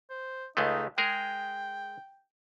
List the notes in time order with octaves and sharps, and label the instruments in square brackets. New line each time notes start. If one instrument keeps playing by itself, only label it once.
[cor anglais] C5
[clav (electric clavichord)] C#2 G#3 A3 [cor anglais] D#4
[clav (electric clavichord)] G#3 G#4 A#4 [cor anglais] G5